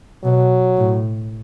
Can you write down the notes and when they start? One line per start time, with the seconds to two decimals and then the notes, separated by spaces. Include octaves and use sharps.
0.24 B2 F#3
0.77 A2